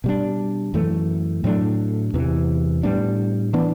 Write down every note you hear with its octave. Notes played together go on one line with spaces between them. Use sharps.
B2 G3 D4
F#2 E3 A3
A2 F#3 A3 D4
E2 C3 E3
A2 G3 B3 D4
E3 B3 D4